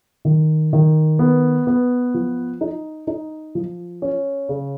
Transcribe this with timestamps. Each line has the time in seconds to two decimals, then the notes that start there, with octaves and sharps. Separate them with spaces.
0.25 D#3
0.73 D#3
1.19 B3
1.67 B3
2.14 F3
2.61 D#4
3.07 D#4
3.55 F3
4.02 C#4
4.49 C#3